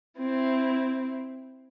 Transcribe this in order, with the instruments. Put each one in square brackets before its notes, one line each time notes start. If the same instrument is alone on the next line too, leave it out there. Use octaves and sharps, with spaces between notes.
[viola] C4 E4